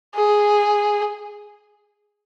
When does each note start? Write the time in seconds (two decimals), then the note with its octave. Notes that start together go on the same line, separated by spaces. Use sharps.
0.16 G#4